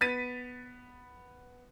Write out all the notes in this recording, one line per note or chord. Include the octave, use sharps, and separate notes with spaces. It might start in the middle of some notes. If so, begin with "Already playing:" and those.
B3 A6 B6 D#7